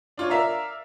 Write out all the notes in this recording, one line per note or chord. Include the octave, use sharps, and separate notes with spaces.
D4 F4 C#5
A#4 D5 E5 F5 A#5